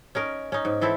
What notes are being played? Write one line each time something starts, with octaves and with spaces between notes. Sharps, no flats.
C#4 D#4 A#4
C#4 D#4
G#2
E3 C4 E4 A4